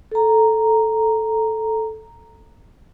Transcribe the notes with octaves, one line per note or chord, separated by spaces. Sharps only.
A4 A#5